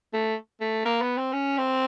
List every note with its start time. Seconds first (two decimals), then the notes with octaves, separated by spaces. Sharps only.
0.13 A3
0.61 A3
0.85 A#3
1.01 B3
1.17 C4
1.33 C#4
1.57 C4